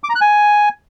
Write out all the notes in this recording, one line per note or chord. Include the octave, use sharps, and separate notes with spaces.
D6
A#5
F#6
G#5